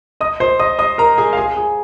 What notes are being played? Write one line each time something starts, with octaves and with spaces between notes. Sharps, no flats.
D#5 D#6
C5 C6
D#5 D#6
D#5 D#6
A#4 A#5
G#4 G#5
F5
G#4 G#5
G#4